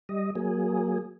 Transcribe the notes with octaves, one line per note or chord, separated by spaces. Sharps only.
G3 D#5
F#3 A#3 G#4